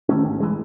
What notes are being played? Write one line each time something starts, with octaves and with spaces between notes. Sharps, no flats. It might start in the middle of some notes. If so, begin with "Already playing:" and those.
D#3 A3 C#4
G#1
E3 G#3